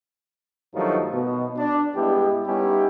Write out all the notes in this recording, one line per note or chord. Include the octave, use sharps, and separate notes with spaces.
G2 D#3 F3 F#3 A3 D#4
B2
D4
G2 G#3 B3 E4 G4
G3 B3 C#4 D#4 E4 G4